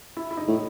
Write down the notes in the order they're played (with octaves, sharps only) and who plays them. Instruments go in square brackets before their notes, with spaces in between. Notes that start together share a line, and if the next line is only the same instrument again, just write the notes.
[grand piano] E4
E4
D#4
[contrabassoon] A2